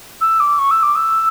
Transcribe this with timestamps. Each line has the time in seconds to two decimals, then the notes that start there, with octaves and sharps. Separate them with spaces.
0.21 E6
0.40 D6
0.58 C#6
0.70 E6
0.82 D6
0.95 E6